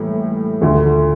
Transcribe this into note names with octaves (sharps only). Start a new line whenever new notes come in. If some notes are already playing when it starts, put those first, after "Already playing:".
Already playing: A2 E3 G3 A#3
D2 D3 F3 A3